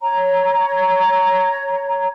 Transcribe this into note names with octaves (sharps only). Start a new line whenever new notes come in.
C#5 A#5